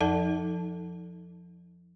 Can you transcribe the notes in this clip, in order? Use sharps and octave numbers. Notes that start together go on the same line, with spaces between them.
F2 F3 D#4 A4 D5 A5